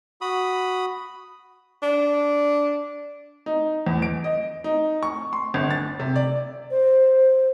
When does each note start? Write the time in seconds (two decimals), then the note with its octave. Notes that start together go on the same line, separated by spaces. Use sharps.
0.21 F#4 B5 D#6
1.83 D4
3.46 D#4
3.87 E2
4.02 D7
4.24 D#5
4.64 D#4
5.03 C#6
5.33 C6
5.54 G1
5.71 A6
6.00 C3
6.16 D5
6.71 C5